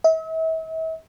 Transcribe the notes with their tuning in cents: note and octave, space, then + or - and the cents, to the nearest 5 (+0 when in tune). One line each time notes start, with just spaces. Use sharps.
E5 -40